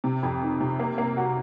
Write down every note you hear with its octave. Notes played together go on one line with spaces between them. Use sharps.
C3
F2
D#3
C3
A#3
A#3
F#4